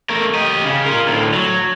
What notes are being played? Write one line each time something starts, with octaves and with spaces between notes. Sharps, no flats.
A3 A#4
G4 D#5
C#3
F4 A#4
D2 A2
F#3